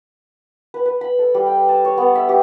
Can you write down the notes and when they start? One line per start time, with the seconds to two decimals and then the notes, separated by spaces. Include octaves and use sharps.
0.74 B4
0.86 B4
1.01 B5
1.19 A4
1.35 G3
1.47 G5
1.69 A5
1.85 C#5
1.98 B3
2.15 E5
2.29 G4